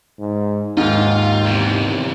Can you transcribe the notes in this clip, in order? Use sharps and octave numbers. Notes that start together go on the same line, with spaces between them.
G#2
D#2 G#2 F4
E2 C3